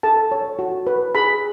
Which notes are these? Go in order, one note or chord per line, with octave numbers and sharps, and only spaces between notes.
A4 A5
C#5
F#4
B4
G#4 B5